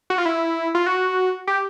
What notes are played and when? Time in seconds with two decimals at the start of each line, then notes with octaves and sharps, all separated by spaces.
0.10 F#4
0.18 F4
0.25 E4
0.75 F4
0.86 F#4
1.47 G4